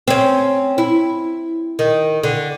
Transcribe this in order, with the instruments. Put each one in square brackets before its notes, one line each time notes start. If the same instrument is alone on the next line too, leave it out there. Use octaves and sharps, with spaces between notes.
[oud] C4 C#4
E4
D#3
D3